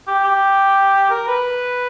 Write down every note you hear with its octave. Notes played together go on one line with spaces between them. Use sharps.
G4
G4
A#4
B4